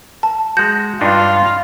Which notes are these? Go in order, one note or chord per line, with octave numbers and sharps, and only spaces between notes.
A5
G#3 F#4 G6
G2 D4 D#4 F4